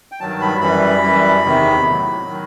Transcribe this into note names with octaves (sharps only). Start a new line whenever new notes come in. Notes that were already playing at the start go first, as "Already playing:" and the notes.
G5
G2 D#3 F#3 A5
B5
F#2 E3 G3 B5
F#2 E3 G3
E2 C3 D#3
A2 F#3
D#3 F#3